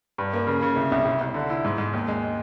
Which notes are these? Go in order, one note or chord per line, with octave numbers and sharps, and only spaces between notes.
G2
A#3
C#3
C#3
C2
C2
C2
C2
D3
E4
G#2
G#2
D#2
G#3